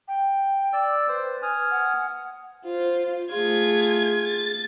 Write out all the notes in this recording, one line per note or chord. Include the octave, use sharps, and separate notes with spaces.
G5
D5 E6
B4 C5
G#5 D#6 F6
F#5
F4 C5
A3 F4 G#4 G#6
A6